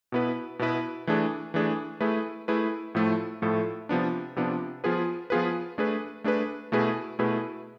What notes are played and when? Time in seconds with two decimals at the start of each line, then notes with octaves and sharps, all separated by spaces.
0.12 B2 B3 E4 B4
0.59 B2 B3 E4 B4
1.07 E3 A3 D4 G#4
1.54 E3 A3 D4 G#4
2.00 A3 E4 G#4 B4
2.48 A3 E4 G#4 B4
2.95 A2 F3 A3 E4 A4
3.42 A2 F3 A3 E4 A4
3.89 C3 F3 B3 D4
4.36 C3 F3 B3 D4
4.84 F3 B3 F4 G#4 B4
5.30 F3 B3 F4 G#4 B4
5.78 A3 D4 G#4 B4
6.24 A3 D4 G#4 B4
6.72 B2 A3 E4 G#4 B4
7.19 B2 A3 E4 G#4 B4